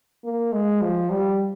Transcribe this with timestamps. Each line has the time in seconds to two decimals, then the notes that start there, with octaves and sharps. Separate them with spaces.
0.25 A#3
0.53 G#3
0.82 F3
1.10 G3